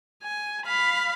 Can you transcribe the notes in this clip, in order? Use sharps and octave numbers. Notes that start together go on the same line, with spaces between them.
G#5
F5 B5